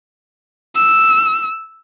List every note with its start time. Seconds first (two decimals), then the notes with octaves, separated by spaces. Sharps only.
0.75 E6